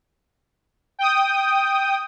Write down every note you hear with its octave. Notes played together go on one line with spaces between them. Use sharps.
G5 D#6